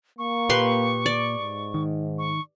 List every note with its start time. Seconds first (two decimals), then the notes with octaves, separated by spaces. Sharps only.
0.18 A#3 C#6
0.49 A#2 G4 B4 C6
1.06 D5
1.37 G#2
1.74 D#3
2.18 C#6